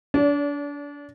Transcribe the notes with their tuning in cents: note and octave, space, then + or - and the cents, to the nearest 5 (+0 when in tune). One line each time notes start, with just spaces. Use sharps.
D4 -30 D5 -45